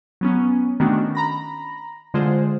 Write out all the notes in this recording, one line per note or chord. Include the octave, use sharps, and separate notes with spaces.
F#3 B3 C#4
D#3 A3 B3 C#4 D4 F#4
A#5 B5 A#6
D3 G#3 F4 G#4 C5